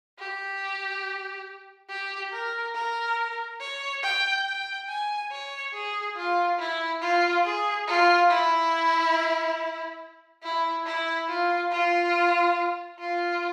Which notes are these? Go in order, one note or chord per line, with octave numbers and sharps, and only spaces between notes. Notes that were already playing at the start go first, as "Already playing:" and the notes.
G4
G4
A#4
A#4
C#5
G5
G5
G#5
C#5
G#4
F4
E4
F4
G#4
F4
E4
E4
E4
F4
F4
F4